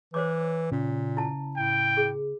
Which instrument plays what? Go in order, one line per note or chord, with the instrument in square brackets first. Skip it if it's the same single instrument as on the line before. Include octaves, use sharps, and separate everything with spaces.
[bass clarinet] E3 [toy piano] C5 C#5 D6
[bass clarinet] A#2 [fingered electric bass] C#3
[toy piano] E4 A5
[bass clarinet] A2 [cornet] G5
[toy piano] G#4